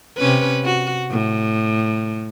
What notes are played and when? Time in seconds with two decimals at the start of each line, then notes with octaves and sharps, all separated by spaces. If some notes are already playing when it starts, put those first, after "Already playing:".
0.18 C3 C#4 B4
0.65 F#4
1.11 A2